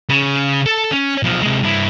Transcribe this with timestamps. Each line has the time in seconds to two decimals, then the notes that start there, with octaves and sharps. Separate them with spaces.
0.09 C#3
0.66 A4 A5
0.91 C#4
1.23 B1 F3
1.43 C3 G#3
1.63 G2 E4